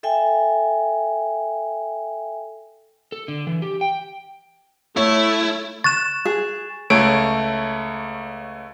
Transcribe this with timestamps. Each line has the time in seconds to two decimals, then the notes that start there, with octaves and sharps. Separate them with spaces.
0.03 A4 E5 G5 G#5
3.12 A4
3.28 D3
3.47 E3
3.62 G4
3.81 G5
4.97 A3 E4 C#5
5.84 C#6 F#6 A6 E7
6.25 G#4
6.90 C#2 A3 C#5 D7